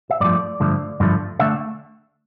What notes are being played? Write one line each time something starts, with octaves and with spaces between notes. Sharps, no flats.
E5
G2 D3 F3 A3 D5
G2 D3 F3 A3
G2 D3 F3 A3
D3 A3 E5